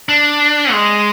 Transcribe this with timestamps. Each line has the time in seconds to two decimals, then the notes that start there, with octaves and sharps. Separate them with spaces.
0.09 D4
0.72 G#3